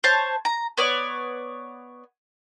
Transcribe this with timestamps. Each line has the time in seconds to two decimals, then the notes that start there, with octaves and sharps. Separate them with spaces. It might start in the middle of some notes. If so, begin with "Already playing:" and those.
0.04 C5 C#5 A5
0.45 A#5
0.77 B3 C#5 D5